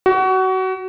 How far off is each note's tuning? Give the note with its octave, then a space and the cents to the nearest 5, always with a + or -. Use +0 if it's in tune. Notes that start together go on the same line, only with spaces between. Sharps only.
F#4 +25